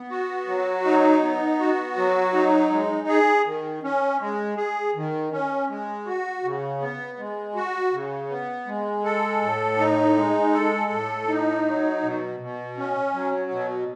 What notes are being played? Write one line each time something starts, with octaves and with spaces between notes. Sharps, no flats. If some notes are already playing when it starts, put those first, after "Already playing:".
Already playing: B3
F#4
F#3
D#4
B3
F#4
F#3
D#4
G#3
G#4
D#3
C#4
G#3
G#4
D#3
C#4
G#3
F#4
C#3
B3
G#3
F#4
C#3
B3
G#3
A4
A2
D#4
G#3
A4
A2
D#4
F#3
B2
B2
C#4
F#3
B2